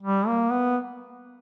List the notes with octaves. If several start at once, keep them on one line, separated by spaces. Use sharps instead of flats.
G3
A#3
B3